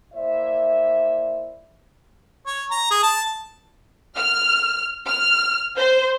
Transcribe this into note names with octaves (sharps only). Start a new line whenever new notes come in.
A#3 E4 C5 D5 E5
C#5
A#5
G#4
A5
F6
F6
C5